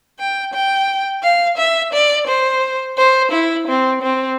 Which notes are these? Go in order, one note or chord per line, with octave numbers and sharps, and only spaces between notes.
G5
G5
F5
E5
D5
C5
C5
E4
C4
C4